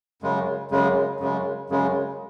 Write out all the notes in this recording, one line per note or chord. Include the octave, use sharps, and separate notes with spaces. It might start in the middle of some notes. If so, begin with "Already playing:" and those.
F#2 C#3 G#3
F#2 C#3 G#3
F#2 C#3 G#3
F#2 C#3 G#3